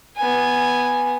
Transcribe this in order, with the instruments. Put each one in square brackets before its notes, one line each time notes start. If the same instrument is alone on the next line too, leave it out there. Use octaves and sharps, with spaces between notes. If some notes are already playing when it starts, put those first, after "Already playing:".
[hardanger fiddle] B3 G#5